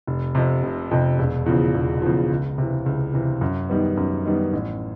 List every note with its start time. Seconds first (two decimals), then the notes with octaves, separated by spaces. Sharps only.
0.07 F1
0.35 F2 C3
0.63 F1
0.91 F2 C3
1.19 E1
1.46 E2 C#3 F3
1.74 E1
2.02 E2 C#3 F3
2.30 C#2
2.58 C3 E3
2.86 C#2
3.14 C3 E3
3.41 F#2
3.69 D#3 G3 B3
3.97 F#2
4.25 D#3 G3 B3
4.53 A1